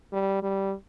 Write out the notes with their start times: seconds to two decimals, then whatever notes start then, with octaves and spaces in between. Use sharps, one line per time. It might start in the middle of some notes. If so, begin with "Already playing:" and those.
0.13 G3
0.43 G3